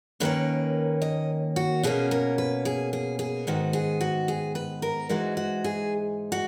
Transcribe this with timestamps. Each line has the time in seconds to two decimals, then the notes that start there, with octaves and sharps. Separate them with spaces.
0.20 D#2 D#3 A#3 C#4 B4
1.02 D#5
1.56 F#4
1.83 B2 A#3 C#4 G#4
2.11 A#4
2.38 B4
2.65 G#4
2.93 G#4
3.19 G#4
3.47 G#2 D#3 G#3 B3 F#4
3.73 G#4
4.01 F#4
4.28 G#4
4.55 B4
4.82 A#4
5.09 G#2 E3 G#3 D#4 F#4
5.37 F#4
5.64 G#4
6.32 F#4